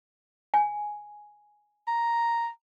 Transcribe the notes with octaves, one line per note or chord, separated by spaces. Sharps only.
G#5
A#5